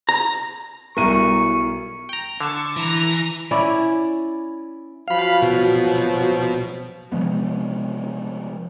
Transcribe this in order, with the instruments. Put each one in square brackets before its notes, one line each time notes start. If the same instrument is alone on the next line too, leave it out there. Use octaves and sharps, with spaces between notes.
[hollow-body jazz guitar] A#5
[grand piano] B1 D#7 [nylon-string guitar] G3 E4 A#4 [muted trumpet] C#6
[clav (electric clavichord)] G5 A#5
[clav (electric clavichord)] D3 [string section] A5 C#6
[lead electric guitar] E3 [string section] A#5 A#6
[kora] C#4 E4 D5
[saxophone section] F3 F#3 F#4 [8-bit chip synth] F5 B5
[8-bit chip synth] B2
[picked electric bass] C3 F3 G#3 B3